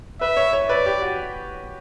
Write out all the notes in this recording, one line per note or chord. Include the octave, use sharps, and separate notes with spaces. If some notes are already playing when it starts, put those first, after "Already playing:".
B4 E5
C#5
C#5
B4 D5
G4
F#4